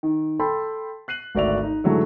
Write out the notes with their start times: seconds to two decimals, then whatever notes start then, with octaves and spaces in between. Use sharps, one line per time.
0.03 D#3
0.39 A4 G5 A5 B5 C6
1.08 F#6 C7 D#7 F#7
1.35 G#1 D2 F#4 D5 E5 F7
1.63 D#4
1.84 G#2 D3 E3 F#3 G#3 A3